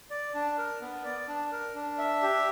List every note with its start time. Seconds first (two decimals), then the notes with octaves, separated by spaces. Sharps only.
0.11 D5
0.34 D4
0.58 A#4
0.81 B3
1.04 D5
1.28 D4
1.52 A#4
1.75 D4
1.98 E5
2.22 G4